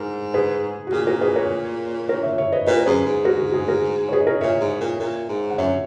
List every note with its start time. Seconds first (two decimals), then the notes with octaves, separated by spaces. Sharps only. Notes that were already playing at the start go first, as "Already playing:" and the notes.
Already playing: G#2 A#4
0.34 G#4 B4
0.87 F#4
0.92 A#2 G#4
1.07 F#4 A#4
1.21 G#4 B4
1.36 A#4 C#5
2.09 A#4 C#5
2.23 C#5 E5
2.38 C#5 E5
2.52 B4 D#5
2.67 A#2 B4
2.77 A#4
2.86 F#2 G#4 B4
3.06 G#2
3.25 F#4 A#4
3.39 F#4
3.50 F#4
3.54 G#4
3.68 F#4 A#4
4.08 C#5
4.12 G#4 B4
4.21 D#5
4.27 A#4 C#5
4.41 A#2 C#5 E5
4.61 G#2
4.81 A#2
5.00 A#2
5.29 G#2
5.50 F#5
5.58 F#2 C#5 E5